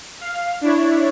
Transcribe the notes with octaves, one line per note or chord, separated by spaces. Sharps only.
F5
D4 E4 C#5